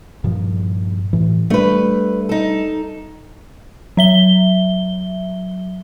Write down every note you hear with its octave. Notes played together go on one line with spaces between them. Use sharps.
G2 A#2 F3
A2 E3
G3 A3 D4 B4
D#4 A4
F#3 E5 G7